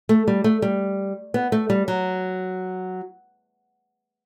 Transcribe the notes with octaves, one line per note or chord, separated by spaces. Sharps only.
A3
G3
A3
G3
B3
A3
G3
F#3